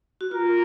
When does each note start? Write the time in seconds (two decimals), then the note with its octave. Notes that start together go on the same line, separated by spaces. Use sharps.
0.21 F#4
0.31 F4 A#4